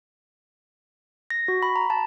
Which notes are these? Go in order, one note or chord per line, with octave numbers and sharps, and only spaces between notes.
A#6
F#4
B5
A#5
A5